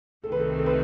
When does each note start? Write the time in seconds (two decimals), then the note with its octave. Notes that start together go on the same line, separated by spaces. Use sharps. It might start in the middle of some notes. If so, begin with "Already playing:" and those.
0.24 C2 C3 D#3 A3 C4 A4
0.32 B4
0.40 A4
0.59 A4
0.66 B4